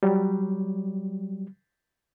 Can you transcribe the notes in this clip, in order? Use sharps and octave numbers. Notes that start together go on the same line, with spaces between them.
F#3 G3